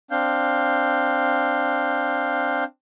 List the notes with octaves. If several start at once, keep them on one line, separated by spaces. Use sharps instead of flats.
C4 D4 F5 G6